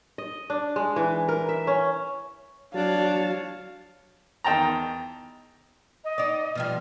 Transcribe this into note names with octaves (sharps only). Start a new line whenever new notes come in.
D#5
D4
G#3
E3
A#4
E5
C#4
F#3 D4 C#5 F5 A5
E2 D#3 G5 A5 A#5
D#5
D#4 D5
B2 F3 G3 F6